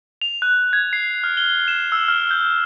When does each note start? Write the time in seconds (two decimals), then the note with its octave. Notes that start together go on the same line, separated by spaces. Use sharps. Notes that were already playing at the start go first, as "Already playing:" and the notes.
0.22 F7
0.42 F#6
0.73 G#6
0.93 C7
1.24 F6
1.37 G7
1.68 E7
1.92 E6
2.08 F6
2.31 G6